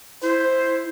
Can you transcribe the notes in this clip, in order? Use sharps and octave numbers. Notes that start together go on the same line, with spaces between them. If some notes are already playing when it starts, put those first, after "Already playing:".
E4 C5